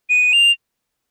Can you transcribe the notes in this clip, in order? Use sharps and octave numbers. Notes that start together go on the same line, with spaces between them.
D#7
F7